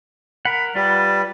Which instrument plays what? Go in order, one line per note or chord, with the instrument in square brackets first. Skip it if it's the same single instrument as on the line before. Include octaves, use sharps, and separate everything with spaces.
[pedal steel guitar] A#4 F#5 [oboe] B5
[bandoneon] G3 [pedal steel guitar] F4 B4 [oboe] A5